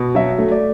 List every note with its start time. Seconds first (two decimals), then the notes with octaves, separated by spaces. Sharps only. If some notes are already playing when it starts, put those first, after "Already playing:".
Already playing: B2
0.15 F#3 E5
0.38 A3
0.51 D5